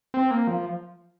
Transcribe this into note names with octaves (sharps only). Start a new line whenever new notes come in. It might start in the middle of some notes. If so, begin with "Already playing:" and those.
C4
A#3
F3